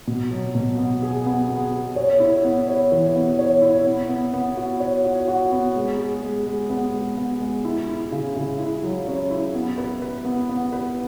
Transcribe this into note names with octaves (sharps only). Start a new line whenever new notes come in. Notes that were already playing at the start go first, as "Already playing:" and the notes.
B2
F#3
B2
B3
G#4
B3
B3
G#4
C#5
E4
B3
C#5
E3
B3
C#5
E4
B3
B3
B3
F#4
C#5
F#4
F#4
B3
G#3
G#4
G#3
G#3
B3
G#3
B3
G#3
E4
E4
C#3
C#3
E4
F#3
C#4
E4
B3
B4
B4
B3
B3
B4